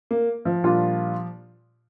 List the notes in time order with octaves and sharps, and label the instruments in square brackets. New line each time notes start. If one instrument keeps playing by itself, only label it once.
[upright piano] A#3
F3
[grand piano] A#2 G3 D4 F4